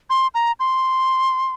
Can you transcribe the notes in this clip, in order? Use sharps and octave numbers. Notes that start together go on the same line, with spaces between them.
C6
A#5
C6